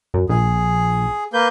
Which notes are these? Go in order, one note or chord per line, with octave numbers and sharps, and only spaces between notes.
F#2
A#1 G#4
A#3 B4 G6